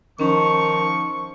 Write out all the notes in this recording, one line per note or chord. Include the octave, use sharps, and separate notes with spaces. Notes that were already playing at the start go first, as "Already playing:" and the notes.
D#3 F3 C#4 C#6